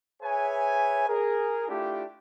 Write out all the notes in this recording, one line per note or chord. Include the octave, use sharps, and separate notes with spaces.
G#4 B4 C#5 E5 G#5
G#4 A#4
A3 D4 E4 F4 G4